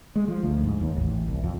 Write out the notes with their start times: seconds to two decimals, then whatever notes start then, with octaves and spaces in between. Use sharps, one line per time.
0.16 G#3
0.28 F3
0.43 D2
0.64 G#2
0.81 D#2
0.96 A1
1.28 C2
1.43 F2